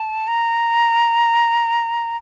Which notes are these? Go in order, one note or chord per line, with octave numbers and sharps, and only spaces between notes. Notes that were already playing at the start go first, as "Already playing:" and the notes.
Already playing: A5
A#5